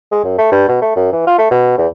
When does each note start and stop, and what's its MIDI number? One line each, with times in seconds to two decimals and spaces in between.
0.12 0.21 56
0.24 0.37 42
0.38 0.52 57
0.52 0.67 43
0.68 0.81 47
0.82 0.94 57
0.96 1.11 42
1.13 1.23 52
1.27 1.35 65
1.38 1.50 57
1.51 1.75 47
1.78 1.87 40